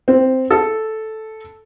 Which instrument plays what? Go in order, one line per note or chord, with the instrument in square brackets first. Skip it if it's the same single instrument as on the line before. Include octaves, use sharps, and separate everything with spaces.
[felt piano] C4
A4